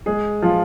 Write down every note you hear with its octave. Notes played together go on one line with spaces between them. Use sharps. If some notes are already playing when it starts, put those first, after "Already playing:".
G#3 G#4
F3 F4